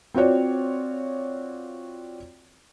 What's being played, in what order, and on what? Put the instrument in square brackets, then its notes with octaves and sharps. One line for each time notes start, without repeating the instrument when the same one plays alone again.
[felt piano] C4 F4 F#4 C#5 D5